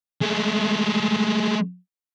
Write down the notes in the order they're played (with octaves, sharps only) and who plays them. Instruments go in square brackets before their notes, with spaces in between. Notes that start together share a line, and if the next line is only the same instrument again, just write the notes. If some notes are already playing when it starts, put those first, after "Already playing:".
[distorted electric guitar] G#3 A3